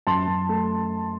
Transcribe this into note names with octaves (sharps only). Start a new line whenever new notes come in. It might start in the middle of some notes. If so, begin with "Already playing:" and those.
F#2 A5 C6
F#2
A3